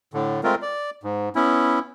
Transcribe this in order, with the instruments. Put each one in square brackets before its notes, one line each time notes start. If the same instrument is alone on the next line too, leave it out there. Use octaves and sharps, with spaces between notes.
[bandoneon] A2 D3
G#3 A3 C4 F4 A#4
D5
G#2
B3 C#4 E4